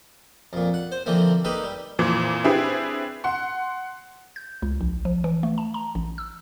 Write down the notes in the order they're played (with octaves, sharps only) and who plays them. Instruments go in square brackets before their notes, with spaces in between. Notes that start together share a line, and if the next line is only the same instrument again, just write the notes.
[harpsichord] F2 A#2
F#5
C5
D3 E3 F3 A#3 C4
A#3 D#4 G4 A4 B4
G3
[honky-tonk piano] F2 A#2 E3
C4 D4 E4 G4 G#4 B4
F#5 C6
[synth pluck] G6
C#2
A#1
F3
E3
A3
A5
A#5
A1
E6